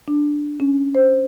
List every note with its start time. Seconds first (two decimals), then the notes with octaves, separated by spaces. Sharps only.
0.08 D4
0.60 C#4
0.95 C5